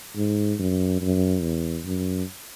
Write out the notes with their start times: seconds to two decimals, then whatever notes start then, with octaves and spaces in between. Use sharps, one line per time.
0.16 G#2
0.59 F#2
1.01 F#2
1.42 E2
1.85 F#2